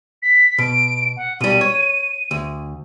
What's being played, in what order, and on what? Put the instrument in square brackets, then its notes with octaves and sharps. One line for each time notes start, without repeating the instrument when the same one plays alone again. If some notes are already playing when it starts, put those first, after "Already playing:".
[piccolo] B6
[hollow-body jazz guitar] B2 [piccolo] D7
[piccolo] F#5
[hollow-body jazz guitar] B2 G3 [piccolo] D#7
[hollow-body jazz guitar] C#5
D2